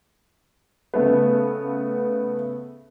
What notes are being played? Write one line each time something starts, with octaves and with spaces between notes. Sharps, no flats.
C#3 A3 B3